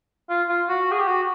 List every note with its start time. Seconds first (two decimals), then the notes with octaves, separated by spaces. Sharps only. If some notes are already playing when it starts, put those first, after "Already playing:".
0.29 F4
0.49 F4
0.69 F#4
0.92 G#4
0.99 G4
1.07 F#4